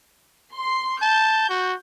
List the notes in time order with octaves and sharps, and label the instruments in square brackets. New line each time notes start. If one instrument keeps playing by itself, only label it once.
[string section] C6
[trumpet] A5 [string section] G6
[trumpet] F#4